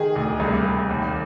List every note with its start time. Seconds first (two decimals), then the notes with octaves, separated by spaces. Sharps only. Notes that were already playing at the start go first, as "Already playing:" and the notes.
Already playing: D#3 G#4
0.15 D2
0.40 C2
0.65 C2
0.90 D#2